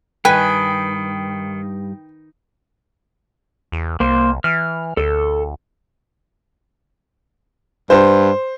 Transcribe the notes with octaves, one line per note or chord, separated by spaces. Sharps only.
G2 D#3 B4 G5 G#5
E2
C2 A#3 C5
E3 F6
D2 A4
G2 C5